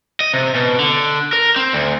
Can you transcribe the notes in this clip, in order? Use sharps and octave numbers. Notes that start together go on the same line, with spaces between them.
D#5
C3
B2
D3
A#4
C4
D2